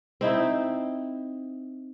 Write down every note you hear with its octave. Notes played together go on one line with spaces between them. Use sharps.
C4 D#4 E4